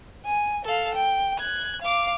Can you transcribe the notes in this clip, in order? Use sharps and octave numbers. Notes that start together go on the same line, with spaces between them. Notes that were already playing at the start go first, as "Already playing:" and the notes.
G#5
A4 F5
G5
F#6 G#6
F5 D6